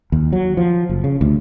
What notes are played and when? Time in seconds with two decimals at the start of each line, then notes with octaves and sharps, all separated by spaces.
0.12 D#2
0.33 F#3
0.57 F3
0.89 F#1
1.04 C#3
1.21 D2